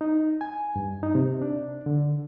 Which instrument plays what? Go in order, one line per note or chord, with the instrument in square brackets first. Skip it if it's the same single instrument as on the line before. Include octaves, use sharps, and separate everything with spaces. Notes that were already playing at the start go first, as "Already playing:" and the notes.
[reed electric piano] D#4
G#5
G2
D#4
C3
D4
D3